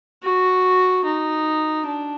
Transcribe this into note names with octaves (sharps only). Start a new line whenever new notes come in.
F#4
D#4
D4